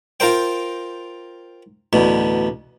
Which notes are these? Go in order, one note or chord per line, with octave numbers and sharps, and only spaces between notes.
F4 A#4 C5 G5
A1 D2 B2